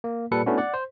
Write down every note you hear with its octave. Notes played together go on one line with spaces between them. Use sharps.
A#3
A#2 G3 A4 B4 C#7
A3 B3 C#4 D4 E4 F#4
D5 F#5
C5